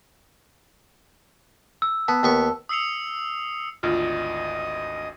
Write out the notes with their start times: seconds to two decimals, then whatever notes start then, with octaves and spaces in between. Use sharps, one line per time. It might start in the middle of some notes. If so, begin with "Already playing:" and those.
1.82 E6
2.08 B3 A5
2.23 D#2 B3 C#6
2.69 D#6 E6 C7 C#7 F7
3.83 G#1 D2 F4 D#5